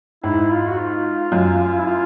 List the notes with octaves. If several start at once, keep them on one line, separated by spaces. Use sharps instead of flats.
G#2 E4
F4
F#4
F4
F#2
E4
F4